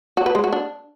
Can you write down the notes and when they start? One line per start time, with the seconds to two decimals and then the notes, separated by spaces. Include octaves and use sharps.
0.17 F#4
0.26 B4
0.35 G#3
0.44 F#4
0.52 D4